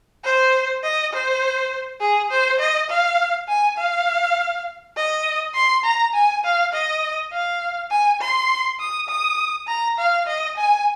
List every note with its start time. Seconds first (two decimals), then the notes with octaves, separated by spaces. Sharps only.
0.24 C5
0.83 D#5
1.13 C5
2.00 G#4
2.31 C5
2.59 D#5
2.89 F5
3.49 G#5
3.78 F5
4.97 D#5
5.54 C6
5.84 A#5
6.14 G#5
6.44 F5
6.73 D#5
7.32 F5
7.90 G#5
8.21 C6
8.79 D#6
9.08 D#6
9.67 A#5
9.98 F5
10.26 D#5
10.57 G#5